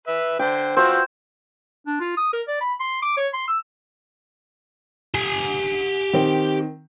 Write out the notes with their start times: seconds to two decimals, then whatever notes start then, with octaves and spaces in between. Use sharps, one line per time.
0.07 B4 E5
0.39 D3 C5 G5
0.77 F4 F#4 C5 E6
1.86 D4
2.00 F4
2.17 D#6
2.33 A#4
2.47 D5
2.61 B5
2.80 C6
3.02 D6
3.17 C#5
3.33 C6
3.48 E6
5.15 G4 G#5
6.13 D#3 C4